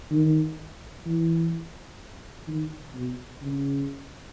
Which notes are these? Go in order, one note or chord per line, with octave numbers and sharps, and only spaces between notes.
D#3
E3
D#3
B2
C#3